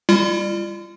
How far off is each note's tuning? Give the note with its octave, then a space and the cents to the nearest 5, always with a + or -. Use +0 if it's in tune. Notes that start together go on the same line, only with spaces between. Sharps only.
G3 +25 F4 -35